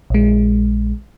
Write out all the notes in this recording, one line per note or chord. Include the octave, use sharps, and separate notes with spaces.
A#1 G#3